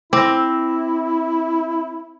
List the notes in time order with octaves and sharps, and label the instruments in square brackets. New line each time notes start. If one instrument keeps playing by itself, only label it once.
[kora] C4 [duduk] E4 [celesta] D6 E6 A#6